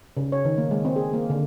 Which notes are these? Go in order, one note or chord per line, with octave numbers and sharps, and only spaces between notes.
C#3
C#5
D#3
A#3
G#3
C4
G#4
A#3
D3